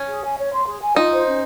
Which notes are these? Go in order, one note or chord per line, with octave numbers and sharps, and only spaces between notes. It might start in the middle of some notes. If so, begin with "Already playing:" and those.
Already playing: C#4
G#4
G#5
C#5
C6
G#4
G#5
D#4 F4
C5
C#4